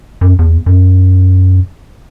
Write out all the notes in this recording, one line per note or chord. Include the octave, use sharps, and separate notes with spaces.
F#2
E2
F#2